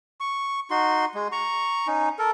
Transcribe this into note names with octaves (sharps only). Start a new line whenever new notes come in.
C#6
D#4 F#4 C6
G#3
A#5 C#6
C#4 D#4
A4 A#4